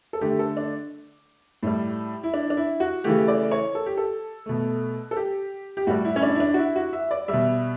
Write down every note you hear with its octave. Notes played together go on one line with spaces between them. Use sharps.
A4
D3 A3 G4
A4
D4
A2 G3
E4
D4
D4
E4
F#4
C#3 E3 A3 G4
D5
C#5
A4
G4
A4
B2 A3
A4
G4
G4
A2 G3 F#4
E4
C#4
D4
E4
D4
F#4
E4
F#4
E5
D5
B2 G3 E5